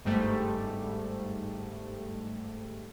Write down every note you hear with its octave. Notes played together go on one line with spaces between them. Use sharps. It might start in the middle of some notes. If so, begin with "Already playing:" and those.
G1 G#2 G3 A3